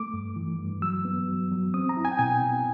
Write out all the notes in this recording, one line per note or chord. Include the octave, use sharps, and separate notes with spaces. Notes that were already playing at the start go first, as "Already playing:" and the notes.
Already playing: A3 D6
G2
E3
G2
F#3 E6
B3
F#3
F#3
C4 D#6
A#5
E4
G#5
G5
B2 G#5
B2